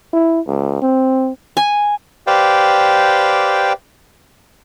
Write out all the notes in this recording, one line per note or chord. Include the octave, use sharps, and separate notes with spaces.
E4
C#2
C4
G#5
G4 B4 C5 D5 F5 G5